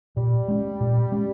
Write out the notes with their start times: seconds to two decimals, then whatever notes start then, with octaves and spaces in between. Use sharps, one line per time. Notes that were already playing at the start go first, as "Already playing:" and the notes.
0.17 A#2 G3
0.48 G#3 C#4
0.80 A#2
1.12 G#3 C#4